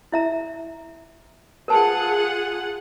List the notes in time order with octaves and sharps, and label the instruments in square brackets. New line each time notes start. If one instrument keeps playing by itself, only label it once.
[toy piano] E4 E5 A#5
[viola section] F4 G#4 F#5 [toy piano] A#4 B4 A5